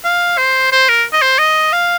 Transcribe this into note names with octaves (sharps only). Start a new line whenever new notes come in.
F5
C5
C5
A#4
D#5
C5
D#5
F5